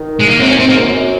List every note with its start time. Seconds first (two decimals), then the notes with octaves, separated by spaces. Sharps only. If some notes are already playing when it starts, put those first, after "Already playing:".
Already playing: D#3
0.19 G#3
0.29 A#3
0.39 F#2 C4
0.49 C#4
0.52 F#2
0.60 C4
0.66 G#2 A#3
0.79 F#2